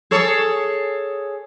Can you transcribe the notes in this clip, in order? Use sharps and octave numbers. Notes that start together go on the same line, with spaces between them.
G#4 A4 C#5